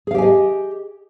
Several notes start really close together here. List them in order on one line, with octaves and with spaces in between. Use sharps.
G#4 F5 G4 G#5 D#5